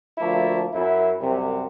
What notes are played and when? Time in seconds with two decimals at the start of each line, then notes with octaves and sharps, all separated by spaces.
0.18 D2 F3 A3 A#3 E4
0.74 F#2 E4
1.21 C2 F#2 C3